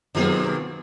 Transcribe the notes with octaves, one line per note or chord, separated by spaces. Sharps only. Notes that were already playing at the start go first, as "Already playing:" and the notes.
B2 D#3 F#3 B3 F4 G#4